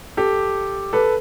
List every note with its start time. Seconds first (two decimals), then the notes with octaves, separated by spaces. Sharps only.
0.17 G4 A4
0.93 A4 B4